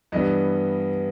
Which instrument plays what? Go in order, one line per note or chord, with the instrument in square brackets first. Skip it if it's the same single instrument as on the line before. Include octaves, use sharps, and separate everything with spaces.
[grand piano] G2 E3 G3 B3 D#5